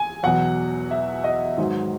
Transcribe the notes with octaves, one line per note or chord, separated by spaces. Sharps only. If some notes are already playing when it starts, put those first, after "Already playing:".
Already playing: G#5
E2 B2 F#3 F#5
E5
D#5
G#2 D#3 F#3